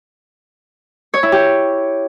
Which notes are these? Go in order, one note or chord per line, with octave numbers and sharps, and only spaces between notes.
C#5
E4
G4